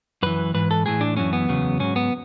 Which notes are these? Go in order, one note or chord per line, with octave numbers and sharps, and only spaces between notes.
F#2 E3 B4
G#2 E3 B4
A4
A2 E3 G#4
D4
F#2 E3 C#4
B3
E2 C#3 F#3
G#2 F#3 C#4
B3